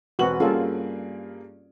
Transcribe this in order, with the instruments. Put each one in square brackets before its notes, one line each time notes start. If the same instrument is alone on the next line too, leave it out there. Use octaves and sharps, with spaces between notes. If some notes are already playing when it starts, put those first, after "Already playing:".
[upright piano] E1 B4 F#7 [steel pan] C4 F#4
[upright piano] G2 A#3 G#4 [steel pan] C#4 F4 A4